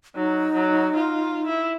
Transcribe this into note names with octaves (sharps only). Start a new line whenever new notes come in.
F#3 D#4
F#3
F4
E4